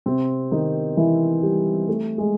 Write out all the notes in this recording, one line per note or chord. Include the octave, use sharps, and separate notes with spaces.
C3 C4
D#3 D#4
E3 E4
G3 G4
A3 A4
G#3 G#4